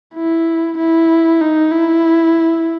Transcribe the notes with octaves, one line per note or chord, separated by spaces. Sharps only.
E4
E4
D#4
E4